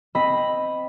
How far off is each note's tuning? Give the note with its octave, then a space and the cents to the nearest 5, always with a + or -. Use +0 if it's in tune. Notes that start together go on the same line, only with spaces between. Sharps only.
C4 +0 D#5 +0 B5 +0